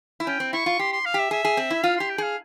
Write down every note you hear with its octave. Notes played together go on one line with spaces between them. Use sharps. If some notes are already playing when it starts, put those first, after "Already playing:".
E4
C#4 G5
C4
E4 C#6
F4
G4 C6
C6
F5
G4 E5
G#4 E5
G#4
C4
E4
F4 F5
G4 C6
G5
G#4 F5